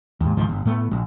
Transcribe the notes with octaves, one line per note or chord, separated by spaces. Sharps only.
D#2 G#2
C#2 G#2 D#3 F3
G1
A2 A3 B3
A#1